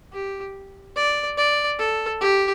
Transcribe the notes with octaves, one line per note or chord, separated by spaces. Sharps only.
G4
D5
D5
A4
G4